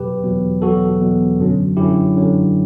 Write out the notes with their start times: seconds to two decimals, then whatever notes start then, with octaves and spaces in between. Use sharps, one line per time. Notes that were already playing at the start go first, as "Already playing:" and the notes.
Already playing: E2 B2 F#3 G4 B4
0.24 E2 B2 F#3
0.62 E2 B2 F#3 F#4 A4
1.01 E2 B2 F#3
1.39 F#2 D3 F#3 C#4
1.77 F#2 D3 F#3 C#4 E4 G4
2.15 F#2 D3 F#3 C#4